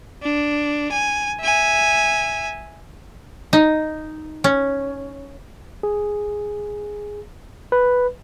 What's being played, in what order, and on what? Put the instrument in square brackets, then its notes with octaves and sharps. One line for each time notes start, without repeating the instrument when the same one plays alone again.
[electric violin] D4
G#5
E5 G#5
[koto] D#4
C#4
[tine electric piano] G#4
B4